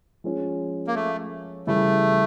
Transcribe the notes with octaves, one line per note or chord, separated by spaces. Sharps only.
F3 G#3 C#4
A#3
A3
C#3 E3 G3 A3